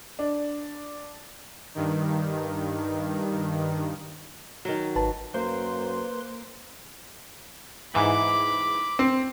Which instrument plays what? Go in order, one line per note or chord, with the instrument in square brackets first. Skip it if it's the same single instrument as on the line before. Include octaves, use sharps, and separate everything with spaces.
[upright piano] D4
[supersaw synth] G2 D#3
[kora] D#3 F#3
[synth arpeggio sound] G#1 B4 A5
[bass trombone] F#2 [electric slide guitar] A#3 [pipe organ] B4 C6 [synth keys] C5
[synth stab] G#2 E3 [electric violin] B5 D6
[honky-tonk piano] C4